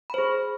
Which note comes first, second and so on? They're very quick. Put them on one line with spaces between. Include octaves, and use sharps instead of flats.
B5 C5 G#4